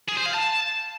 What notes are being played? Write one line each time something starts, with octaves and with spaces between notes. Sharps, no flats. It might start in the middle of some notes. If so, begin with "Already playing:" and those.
G#4
C5
F5
A5